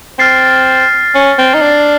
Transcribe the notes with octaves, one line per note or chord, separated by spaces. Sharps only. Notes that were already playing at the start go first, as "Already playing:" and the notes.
C4 F6 A6 C7
C#4
C4
D#4
D4